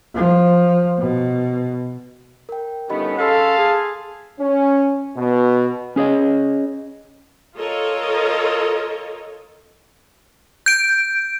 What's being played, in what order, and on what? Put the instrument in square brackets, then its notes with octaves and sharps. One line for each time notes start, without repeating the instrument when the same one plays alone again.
[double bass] F3
B2
[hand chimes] A#4 G5
[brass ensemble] G1 A3 B3 [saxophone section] D#3 C#4 [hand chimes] G4 D#5 B5
[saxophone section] C#4 G#4 A4 [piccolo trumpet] F5 [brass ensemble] A5 [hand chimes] C6 E6 B6
[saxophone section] G#4
[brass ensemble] C#4
B2
[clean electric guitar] C#4 G#4 C#5 D#5
[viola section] F4 A4 A#4 C#5 D#5
[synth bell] G6 D7